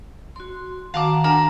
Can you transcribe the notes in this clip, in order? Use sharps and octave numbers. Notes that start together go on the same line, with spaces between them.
F#4 C6
D#3 F#4 F5 F#5 A5 A#5 D6
D4 A#4 F#5 G#5 A#5